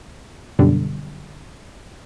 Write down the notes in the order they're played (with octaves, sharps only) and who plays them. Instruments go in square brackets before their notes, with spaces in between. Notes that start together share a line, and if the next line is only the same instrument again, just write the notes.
[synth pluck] F#2 B2 D3 G3